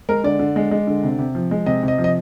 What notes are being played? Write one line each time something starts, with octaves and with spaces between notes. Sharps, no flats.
G#3 A#4
D3 D5
D3
G#3
G#3
D3
C3
C3
F3
G#3
C3 D#5
C3
D#5
F3
D#5